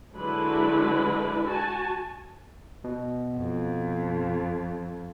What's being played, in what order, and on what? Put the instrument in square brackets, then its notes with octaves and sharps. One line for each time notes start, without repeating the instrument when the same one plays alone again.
[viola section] D3 F#3 G#3 D4 E4 B4
F#4 G#5 A5
[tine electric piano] B2
[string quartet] F2